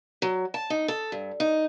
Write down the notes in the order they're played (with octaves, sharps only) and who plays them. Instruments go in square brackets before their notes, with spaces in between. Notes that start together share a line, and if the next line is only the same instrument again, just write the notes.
[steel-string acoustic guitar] F#3
A5
D#4
A4
G2
D#4